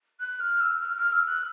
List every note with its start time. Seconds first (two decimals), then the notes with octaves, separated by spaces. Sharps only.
0.20 F#6
0.40 F6
0.60 E6
0.81 F6
0.97 F6
1.12 E6
1.27 F#6